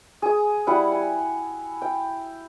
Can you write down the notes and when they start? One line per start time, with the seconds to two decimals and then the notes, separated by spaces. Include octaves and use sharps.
0.22 G#4 D#6
0.67 G3 E4 F#5
0.92 G#5
1.82 G5